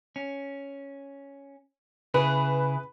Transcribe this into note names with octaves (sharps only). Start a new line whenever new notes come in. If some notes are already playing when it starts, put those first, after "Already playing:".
C#4
C#3 E4 G#4 B4